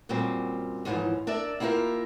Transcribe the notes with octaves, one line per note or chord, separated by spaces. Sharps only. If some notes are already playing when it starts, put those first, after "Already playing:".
F#2 A#2 G3 C4
D#2 G#2 D3 E3 F3
D4 A#4 D5 E5
A#3 B3 E4 F4 G4 A#4